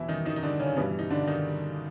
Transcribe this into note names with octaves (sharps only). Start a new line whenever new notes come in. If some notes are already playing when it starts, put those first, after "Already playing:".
Already playing: E2 B2 E3 F#3 E4
D#3 D#4
D#3 D#4
D#4
D3 D4
C#3 C#4
G2 B2 E3 G3 B3
D#4
D3 D4
D#3 D#4